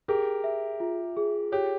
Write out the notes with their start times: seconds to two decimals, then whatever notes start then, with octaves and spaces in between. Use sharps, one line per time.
0.08 G4 G#4 A#4
0.44 E5
0.80 F4
1.17 G#4
1.52 G4 C#5